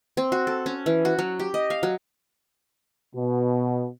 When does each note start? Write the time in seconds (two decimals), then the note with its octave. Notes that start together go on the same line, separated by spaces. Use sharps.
0.17 C4
0.32 F#4
0.47 A4
0.66 C#4
0.86 E3
1.05 F#4
1.19 F#3
1.40 G4
1.54 D#5
1.70 F5
1.83 F#3
3.14 B2